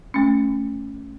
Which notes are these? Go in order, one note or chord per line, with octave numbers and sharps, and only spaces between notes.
A3 C#4